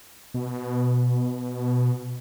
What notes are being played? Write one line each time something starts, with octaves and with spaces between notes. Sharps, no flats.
B2